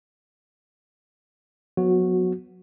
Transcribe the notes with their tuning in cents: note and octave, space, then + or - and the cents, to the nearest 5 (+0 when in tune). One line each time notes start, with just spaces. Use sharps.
F#3 -30 B3 +0 F#4 -10